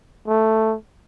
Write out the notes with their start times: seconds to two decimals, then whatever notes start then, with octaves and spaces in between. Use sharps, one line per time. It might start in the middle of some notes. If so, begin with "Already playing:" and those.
0.28 A3